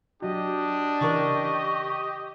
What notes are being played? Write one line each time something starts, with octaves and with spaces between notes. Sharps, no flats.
F#3 D4 F#4 G4 D#5
C#3 E3 A#4 C#6